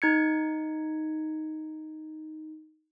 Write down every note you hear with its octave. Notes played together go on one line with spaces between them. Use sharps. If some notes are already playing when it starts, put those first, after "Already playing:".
D#4 G#6 C#7